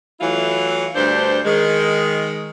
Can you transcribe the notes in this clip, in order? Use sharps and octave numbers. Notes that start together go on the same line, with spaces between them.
E3 F#3 A3 E4 F4
D2 G2 D4 C5
D#3 G#3